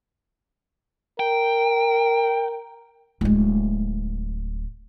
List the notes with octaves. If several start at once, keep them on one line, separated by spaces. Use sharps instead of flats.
A#4 G5
D1 G#3